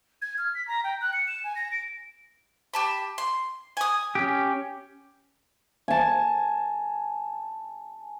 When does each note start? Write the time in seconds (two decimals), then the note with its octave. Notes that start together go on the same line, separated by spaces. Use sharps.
0.22 G#6
0.38 F6
0.55 B6
0.68 A#5
0.84 G5
1.01 F#6
1.13 C#7
1.28 E7
1.44 G#5
1.56 A#6
1.72 D7
2.74 G4 A5 B5
3.18 C6
3.77 G#5 D#6
4.15 C#4 G4
5.88 G#5 A5